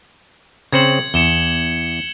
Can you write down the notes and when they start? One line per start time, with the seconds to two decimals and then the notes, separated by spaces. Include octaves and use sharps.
0.73 C#3 C4 C5 G#6 C#7 F#7
1.14 E2 C#7 E7 G7